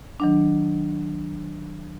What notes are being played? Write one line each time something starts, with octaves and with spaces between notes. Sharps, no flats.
D#3 F#3 D4